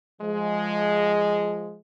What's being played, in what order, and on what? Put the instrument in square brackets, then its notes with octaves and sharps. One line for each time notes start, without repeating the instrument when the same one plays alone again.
[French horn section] F3 G#3